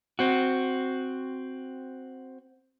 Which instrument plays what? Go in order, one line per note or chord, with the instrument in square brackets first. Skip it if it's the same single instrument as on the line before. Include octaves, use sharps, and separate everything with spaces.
[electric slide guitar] C4 F#4